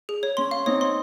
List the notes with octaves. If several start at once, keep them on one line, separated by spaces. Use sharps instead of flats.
G#4
C#5
C#4 C6
F5
C4 D#4 C#5
C6